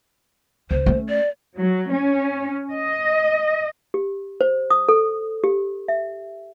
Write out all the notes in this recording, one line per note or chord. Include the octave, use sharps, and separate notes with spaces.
C#2 C5
A3 C#4
D5
F#3
C#4
D#5
G4
C5
D#6
A4
G4
E5